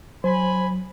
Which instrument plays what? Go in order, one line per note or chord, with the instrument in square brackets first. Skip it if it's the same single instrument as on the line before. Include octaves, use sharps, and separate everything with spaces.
[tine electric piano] F#3 [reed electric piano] C5 [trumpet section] G#5 B5